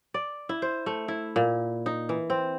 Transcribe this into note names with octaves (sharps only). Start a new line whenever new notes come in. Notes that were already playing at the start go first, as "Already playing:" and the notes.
D5
E4
C5
A3
E4
A#2
D#4
E3
C4